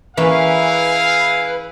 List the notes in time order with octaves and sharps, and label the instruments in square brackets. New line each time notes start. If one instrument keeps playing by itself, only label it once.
[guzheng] E3 A#3 C#4 [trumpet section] E4 G#4 F5 [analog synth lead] B4